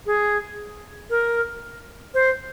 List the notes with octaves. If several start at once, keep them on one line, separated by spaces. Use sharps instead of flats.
G#4
A#4
C5